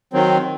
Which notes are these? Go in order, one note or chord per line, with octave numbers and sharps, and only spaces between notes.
D#3 F#3 C4